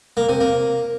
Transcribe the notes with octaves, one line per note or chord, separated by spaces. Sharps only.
A#3
C3
A#3